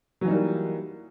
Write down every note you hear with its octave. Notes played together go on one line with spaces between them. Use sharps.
E3 F#3 G3 A#3 D#4